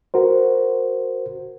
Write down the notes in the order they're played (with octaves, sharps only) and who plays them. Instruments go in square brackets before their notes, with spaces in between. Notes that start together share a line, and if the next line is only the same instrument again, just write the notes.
[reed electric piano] F#4 A#4 C5